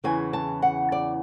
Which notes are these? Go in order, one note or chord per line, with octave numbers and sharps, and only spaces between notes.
E2 C#3 E3 G#5
A5
F#5
D5